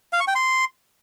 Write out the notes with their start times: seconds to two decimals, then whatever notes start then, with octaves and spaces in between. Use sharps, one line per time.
0.13 F5
0.20 C#6
0.28 G5
0.35 C6